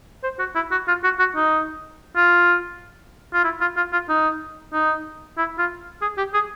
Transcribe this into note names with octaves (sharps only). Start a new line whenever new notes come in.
C5
F#4
E4
F#4
F4
F#4
F#4
D#4
F4
F4
E4
F4
F4
F4
D#4
D#4
E4
F4
G#4
G4
G#4